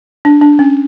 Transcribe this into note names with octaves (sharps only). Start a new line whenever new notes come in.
D4
D4
C#4